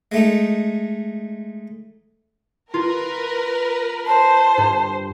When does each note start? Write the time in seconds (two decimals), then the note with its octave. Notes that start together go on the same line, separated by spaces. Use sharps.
0.12 G#3 A3 D#4
2.74 F4 A#4 B4
4.06 C5 A5
4.58 G2